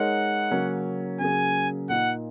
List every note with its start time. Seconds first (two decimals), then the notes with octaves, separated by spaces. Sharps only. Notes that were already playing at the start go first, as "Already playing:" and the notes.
Already playing: G#3 D#4 A#4 C#5 F#5
0.51 C#3 F#3 A#3 C#4
1.20 C#3 F#3 A#3 C#4 G#4 G#5
1.89 A#2 A#3 D#4 F#5